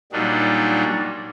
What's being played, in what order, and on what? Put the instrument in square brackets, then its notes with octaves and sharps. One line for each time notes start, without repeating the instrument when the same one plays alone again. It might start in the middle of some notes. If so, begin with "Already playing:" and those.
[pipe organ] A#2 F#3 G3 D4 D#4